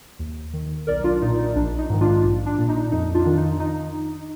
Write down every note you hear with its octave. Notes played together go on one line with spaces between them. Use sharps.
D#2
D#3
B1 A#4 D5
D4 F4
A#2 D#4
D#4
A#1 D4
D#4
G#2 D#3
D4 F4
A#1
D4
A#2
D#4
F2 D#4
D4 F4
D#3
D#4
D#4